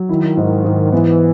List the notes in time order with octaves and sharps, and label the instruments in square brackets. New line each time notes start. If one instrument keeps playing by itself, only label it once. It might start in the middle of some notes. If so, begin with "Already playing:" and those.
Already playing: [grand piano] F#3
[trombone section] D#3 [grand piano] E4
[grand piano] G#2
G#2
[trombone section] E3 [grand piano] B3